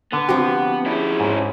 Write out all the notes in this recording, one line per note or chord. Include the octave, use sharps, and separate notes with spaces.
D3 B3
F3 C4 F#4 G4
C#4 E4 G#4
G#2